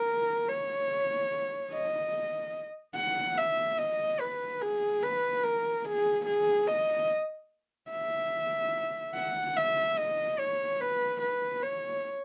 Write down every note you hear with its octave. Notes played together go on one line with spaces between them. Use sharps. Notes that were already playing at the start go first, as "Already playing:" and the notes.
Already playing: A#4
C#5
D#5
F#5
E5
D#5
B4
G#4
B4
A#4
G#4
G#4
D#5
E5
F#5
E5
D#5
C#5
B4
B4
C#5